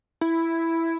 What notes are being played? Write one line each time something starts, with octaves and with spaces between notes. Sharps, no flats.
E4